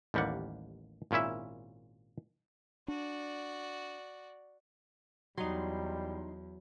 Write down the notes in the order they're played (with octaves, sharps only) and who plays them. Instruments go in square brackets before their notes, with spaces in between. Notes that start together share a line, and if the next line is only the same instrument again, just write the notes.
[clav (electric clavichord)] A1 D#2 G3 A#3 F#5
G#1 A#2 C#4 E4 E5
[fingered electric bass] D4 [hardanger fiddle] F#4 D5
[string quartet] E2 [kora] F#3 [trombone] G3 [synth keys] D#4 C6